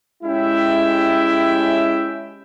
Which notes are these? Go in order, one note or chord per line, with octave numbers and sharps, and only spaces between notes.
G#3 C#4 E4 G4 E5 G5